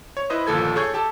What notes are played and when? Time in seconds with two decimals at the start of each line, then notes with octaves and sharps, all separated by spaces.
0.17 C#5
0.30 E4 B4 C5 D#5 E5 D#6
0.47 G1 D#2 A#2 F3 A4 G#6
0.76 G#4 A4 C#5 C#6 G6 G#6
0.94 G4 A4 A5